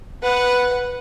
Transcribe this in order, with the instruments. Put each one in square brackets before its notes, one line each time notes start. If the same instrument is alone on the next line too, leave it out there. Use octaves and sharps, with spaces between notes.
[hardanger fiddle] B4 F#5